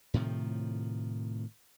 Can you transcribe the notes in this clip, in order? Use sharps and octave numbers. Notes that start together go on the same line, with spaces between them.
A2 C3 D#3 F3